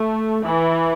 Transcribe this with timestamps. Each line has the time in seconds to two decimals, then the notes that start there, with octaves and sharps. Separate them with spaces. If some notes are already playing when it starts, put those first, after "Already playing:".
Already playing: A3
0.43 E3